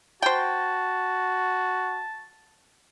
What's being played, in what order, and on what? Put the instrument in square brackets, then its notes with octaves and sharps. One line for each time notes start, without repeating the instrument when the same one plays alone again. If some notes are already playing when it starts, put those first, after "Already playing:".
[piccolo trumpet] F#4 [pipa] C5 G5 [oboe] A5